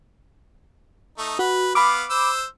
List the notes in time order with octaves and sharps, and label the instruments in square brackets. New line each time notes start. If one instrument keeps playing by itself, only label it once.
[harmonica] A3 D#4
[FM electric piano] F#4 [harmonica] B4
[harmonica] B3 F5 [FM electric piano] B5 D6
[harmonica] C5 E6